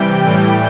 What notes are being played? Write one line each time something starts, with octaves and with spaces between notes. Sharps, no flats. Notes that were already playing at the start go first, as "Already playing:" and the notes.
Already playing: C3 E3 G3 G5
A2 E3 G3